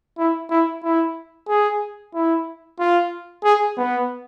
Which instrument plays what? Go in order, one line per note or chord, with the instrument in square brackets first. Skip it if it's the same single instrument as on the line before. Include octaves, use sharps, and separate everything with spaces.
[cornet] E4
E4
E4
G#4
E4
F4
G#4
B3